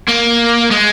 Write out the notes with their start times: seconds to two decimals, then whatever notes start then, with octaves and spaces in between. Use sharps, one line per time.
0.09 A#3
0.71 G#3